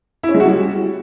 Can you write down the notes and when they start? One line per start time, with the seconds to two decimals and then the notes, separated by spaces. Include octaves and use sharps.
0.23 E4
0.29 C#4
0.34 G#3
0.40 F#4
0.45 G3